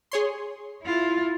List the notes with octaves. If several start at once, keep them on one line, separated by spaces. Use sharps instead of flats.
G#4 C#5 C6
E4 F4